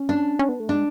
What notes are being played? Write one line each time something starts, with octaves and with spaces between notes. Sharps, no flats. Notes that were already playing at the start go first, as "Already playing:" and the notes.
Already playing: C#4
D4
C#4
B3
A3
G#3 D4